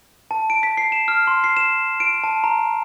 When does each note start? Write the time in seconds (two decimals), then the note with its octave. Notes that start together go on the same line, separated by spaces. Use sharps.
0.31 A5
0.50 D7
0.63 B6
0.77 C7
0.92 E7
1.08 F6
1.27 C6
1.44 C7
1.57 E7
2.00 D7
2.24 A5
2.44 A#5